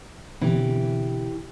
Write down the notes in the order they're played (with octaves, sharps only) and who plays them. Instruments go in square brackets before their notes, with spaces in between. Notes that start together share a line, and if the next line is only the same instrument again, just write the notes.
[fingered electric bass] B2 D3 C4 [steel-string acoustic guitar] E3 G4